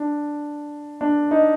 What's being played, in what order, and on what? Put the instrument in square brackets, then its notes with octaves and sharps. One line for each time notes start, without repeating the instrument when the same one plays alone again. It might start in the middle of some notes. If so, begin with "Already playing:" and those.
Already playing: [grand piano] D4
D4
D#4